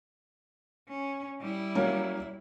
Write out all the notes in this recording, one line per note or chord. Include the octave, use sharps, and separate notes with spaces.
C#4
G3 E4
F#3 A#3 C#4